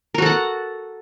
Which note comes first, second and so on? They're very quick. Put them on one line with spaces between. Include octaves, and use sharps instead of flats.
A#4 F#4 A4 F#5